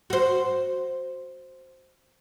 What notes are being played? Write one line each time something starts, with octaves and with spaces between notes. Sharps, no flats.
F#4 C5